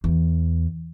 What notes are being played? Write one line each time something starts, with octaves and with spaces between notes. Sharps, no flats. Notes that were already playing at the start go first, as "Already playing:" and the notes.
E2